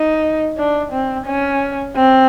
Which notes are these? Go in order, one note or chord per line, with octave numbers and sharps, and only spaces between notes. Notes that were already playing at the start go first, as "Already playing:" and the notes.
Already playing: D#4
D4
C4
C#4
C4